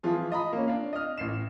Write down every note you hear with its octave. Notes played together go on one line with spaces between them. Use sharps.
E3 F3 F4 G#4
F4 D#5 A#5 B5
A#3 C#4
D4 F5
D#5 F6
A1 C7 E7